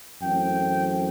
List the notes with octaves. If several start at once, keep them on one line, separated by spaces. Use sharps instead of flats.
F#2 E3 A3 C4 G5